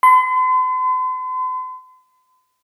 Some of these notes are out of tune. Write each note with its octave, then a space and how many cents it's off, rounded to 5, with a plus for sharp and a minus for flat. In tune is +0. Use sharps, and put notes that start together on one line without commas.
C6 -45